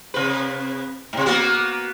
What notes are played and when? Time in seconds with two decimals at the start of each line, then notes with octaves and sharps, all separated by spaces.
0.14 C3 B4
1.13 G#2 C3
1.26 A#3 B3 F#4